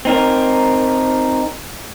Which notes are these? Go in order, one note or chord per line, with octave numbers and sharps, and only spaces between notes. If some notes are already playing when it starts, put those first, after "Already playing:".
C4 D#4 A#4